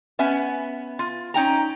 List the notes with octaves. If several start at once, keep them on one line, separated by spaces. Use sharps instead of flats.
B3 C#4 E5 G#5
F4
C#4 D#4 G5 A#5